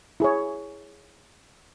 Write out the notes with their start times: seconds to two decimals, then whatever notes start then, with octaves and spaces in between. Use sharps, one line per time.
0.20 E4 G#4 C#5